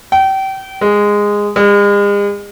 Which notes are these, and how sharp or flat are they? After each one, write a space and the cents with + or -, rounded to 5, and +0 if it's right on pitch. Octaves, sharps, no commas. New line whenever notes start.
G5 -30
G#3 -10
G#3 -40